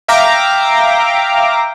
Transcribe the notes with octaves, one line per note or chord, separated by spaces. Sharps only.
E5 F5 G5 A#5 D6